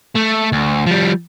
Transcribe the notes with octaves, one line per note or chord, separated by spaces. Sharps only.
A3
D2
F3 G3